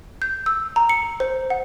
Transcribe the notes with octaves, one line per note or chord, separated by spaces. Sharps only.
G6
E6
A#5
C#7
C5
F#5